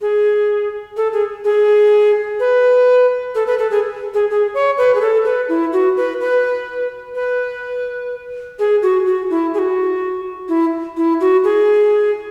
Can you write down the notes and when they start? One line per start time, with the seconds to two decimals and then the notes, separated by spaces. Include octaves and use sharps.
0.01 G#4
0.97 A4
1.13 G#4
1.45 G#4
2.40 B4
3.35 A4
3.47 B4
3.59 A4
3.71 G#4
4.14 G#4
4.30 G#4
4.54 C#5
4.78 B4
4.95 G#4
5.01 A4
5.25 B4
5.49 E4
5.73 F#4
5.97 B4
6.20 B4
7.15 B4
8.59 G#4
8.82 F#4
9.06 F#4
9.30 E4
9.54 G#4
9.59 F#4
10.49 E4
10.97 E4
11.21 F#4
11.44 G#4